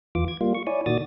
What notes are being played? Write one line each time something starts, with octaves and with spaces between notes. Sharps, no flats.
E2 E3 F4 D6
G#6
G3 A#3 F4
C#6
E4 C#5 D5 G#5
A#2 D#3 F#4 D5 D#6 A6